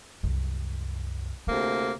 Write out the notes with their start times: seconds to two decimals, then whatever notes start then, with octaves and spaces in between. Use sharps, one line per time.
0.23 C2 F#2
1.47 D2 C3 A3 A#3